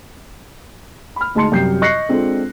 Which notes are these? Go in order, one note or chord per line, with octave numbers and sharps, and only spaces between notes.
B5 F6
D2 G#3 D#4 A5 C6 C#7
F#2 C3 G3 G5 G6 C7
D#5 C#6 F#6 A#6 C7 C#7
G#3 C4 D4 F4 A4